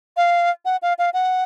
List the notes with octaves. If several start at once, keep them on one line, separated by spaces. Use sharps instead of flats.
F5
F#5
F5
F5
F#5